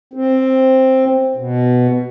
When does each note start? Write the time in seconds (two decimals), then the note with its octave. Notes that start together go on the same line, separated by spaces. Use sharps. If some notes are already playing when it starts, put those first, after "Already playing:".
0.14 C4
1.37 B2